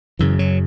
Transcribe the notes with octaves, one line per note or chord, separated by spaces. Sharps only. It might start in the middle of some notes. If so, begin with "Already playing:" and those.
F#2 C#3 E3
F#3